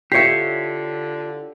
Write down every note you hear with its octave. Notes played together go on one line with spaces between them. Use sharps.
D3 F4 G4 C#5 D5 E5 C7